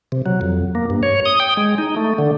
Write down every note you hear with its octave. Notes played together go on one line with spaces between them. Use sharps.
C3
F#3
F2
A#3
G2
C#5
D#6
G5
G#3
D#4
A3
D3